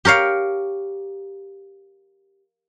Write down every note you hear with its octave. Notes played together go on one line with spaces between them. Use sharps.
G4 A#4 C#5 F5